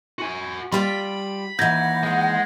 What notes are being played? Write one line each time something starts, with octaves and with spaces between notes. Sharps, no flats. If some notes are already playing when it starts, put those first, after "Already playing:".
F#4 G#5
G3 F4 G5 B5
D#2 E3 F#5 G6 G#6 A#6
G#3 G#4